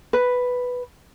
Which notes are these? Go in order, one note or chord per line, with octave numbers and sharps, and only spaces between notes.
B4